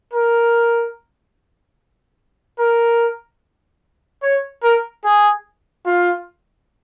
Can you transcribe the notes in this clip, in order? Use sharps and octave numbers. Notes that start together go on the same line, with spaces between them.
A#4
A#4
C#5
A#4
G#4
F4